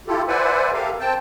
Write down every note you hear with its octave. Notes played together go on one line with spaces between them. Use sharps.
E4 F4 G4 A4
B4 C5 D5 E5 F#5 G#5
G4 A4 A#4 E5 F5
C4 G5 A5